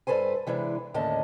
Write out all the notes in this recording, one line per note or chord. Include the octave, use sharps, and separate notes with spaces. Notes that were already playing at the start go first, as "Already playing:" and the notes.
G2 C3 A4 B4 C5 G#5
C3 E3 G#3 D4
D#2 A2 D3 C#4 D#5 A5